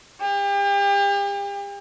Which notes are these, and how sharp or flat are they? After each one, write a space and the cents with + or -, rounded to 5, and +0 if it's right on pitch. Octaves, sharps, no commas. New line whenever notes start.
G4 +40